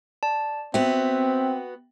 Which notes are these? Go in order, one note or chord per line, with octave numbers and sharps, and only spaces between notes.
D5 A5
B3 C4 F#4 E5 G5